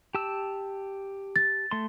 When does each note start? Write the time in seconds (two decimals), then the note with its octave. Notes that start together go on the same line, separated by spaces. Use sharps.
0.15 G4 A5 E6
1.36 A6
1.71 A3 C6